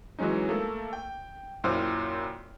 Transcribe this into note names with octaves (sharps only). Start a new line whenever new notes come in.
E3 F#3 G#3 C#4 D#4
A3 A#3 A4
G5
F#2 A#2 E4 C5 G5 F6